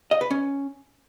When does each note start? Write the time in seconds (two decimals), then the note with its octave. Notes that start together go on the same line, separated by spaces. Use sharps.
0.11 D#5
0.21 B4
0.31 C#4